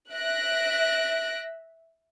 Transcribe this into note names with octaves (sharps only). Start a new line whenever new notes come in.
E5 F#6 A#6 D7